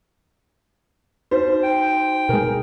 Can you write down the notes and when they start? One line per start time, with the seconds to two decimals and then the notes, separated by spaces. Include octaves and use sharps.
1.31 D#4 F#4 C5
1.63 G5
2.29 B2 G#3 G#4 A#4